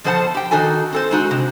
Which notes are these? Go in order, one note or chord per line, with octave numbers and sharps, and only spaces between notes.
B2 F3 A4 C5 F#5 A5
G4 G5
D#3 D#4 F#4 A4 G#5
C4 A4 C5
G#3 D#4 F#4
C3